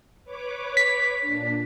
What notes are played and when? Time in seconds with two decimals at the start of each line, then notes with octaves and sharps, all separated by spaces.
0.24 B4 C#5 D6
0.77 B6
1.21 A#2 D4